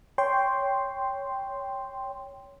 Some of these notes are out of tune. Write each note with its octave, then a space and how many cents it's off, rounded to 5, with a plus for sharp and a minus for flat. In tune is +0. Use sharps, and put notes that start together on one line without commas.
C#5 +10 G5 +0 C6 +0